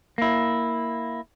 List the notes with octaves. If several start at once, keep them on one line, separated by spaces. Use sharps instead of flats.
A#3 E4